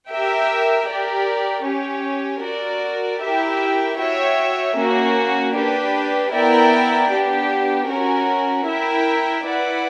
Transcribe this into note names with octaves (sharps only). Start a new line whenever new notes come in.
G4 A#4 E5 G5
G4 A#4 D5
C#4 G4 C#5
F#4 A#4 D5
E4 G4 A#4 E5 G5
F#4 C#5 E5 G5
A#3 C#4 F#4
D4 G4 B4
B3 E4 A#4 D5 G5
B3 D4 G4
C#4 F#4 A#4
E4 A#4 E5 G5
E4 B4 D5 F#5